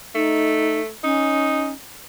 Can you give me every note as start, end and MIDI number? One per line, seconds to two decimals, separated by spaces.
0.15 0.90 57
0.15 0.80 63
1.04 1.71 61
1.04 1.71 63